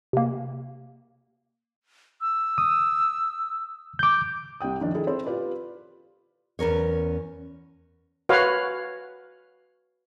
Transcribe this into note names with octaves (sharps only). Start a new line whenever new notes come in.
C3 A#3
E6
D#6
D6 G6
C2 G3 G5 D#6
F#2 D#3 F3 D4
D#3 E4 G#4 A4
C4 E4 A4 C5
F4 G4 B4 D5
E2 C#4 A#4 C#5
F#4 B4 C#5 F5